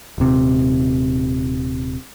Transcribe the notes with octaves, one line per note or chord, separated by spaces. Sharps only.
D#1 C3